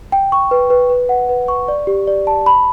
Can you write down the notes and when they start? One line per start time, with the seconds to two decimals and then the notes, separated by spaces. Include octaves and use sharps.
0.12 G5
0.32 C#6
0.51 B4
0.70 B4
0.90 B4
1.09 F#5
1.29 B4
1.48 C#6
1.68 D5
1.87 G4
2.08 D5
2.27 A5
2.46 B5